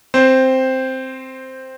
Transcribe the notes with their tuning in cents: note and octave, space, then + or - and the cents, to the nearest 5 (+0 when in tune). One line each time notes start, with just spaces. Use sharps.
C4 +0 C5 +0